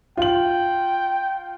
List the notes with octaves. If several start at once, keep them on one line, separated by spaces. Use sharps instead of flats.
F4 G5 F#7